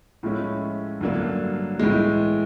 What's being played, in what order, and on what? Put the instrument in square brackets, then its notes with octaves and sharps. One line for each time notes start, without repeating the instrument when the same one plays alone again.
[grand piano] A2 F3 G#3 C#4 E4
G2 D3 F#3 A#3 D4
A2 E3 G#3